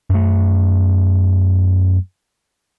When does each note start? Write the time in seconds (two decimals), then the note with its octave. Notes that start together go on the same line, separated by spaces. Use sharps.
0.10 F#2 A3